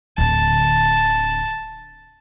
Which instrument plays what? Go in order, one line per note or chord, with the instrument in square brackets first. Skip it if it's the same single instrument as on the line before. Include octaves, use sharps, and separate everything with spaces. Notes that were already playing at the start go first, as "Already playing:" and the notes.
[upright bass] D1 D3 [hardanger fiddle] A5